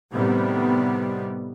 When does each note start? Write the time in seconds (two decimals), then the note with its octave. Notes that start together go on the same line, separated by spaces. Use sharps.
0.13 A2 C3 D#3 G3 B3